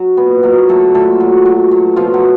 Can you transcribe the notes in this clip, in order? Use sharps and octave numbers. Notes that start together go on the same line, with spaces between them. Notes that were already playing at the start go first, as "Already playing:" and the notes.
Already playing: F#3
A#2 B3 B4
F#3 A#3 A#4
F#3 A3 A4
A#2 A3 A4
F#3
F#3
F#3
B2 F3 F4
F#3 F#4